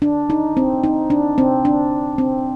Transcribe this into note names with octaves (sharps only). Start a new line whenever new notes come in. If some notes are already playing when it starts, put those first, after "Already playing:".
D4
D#4
C4
D#4
D4
C4
D4
C4